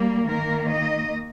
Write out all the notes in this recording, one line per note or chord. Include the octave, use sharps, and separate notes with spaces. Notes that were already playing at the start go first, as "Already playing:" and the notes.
Already playing: G3 A#3
D#3 A#3 A#4
D#5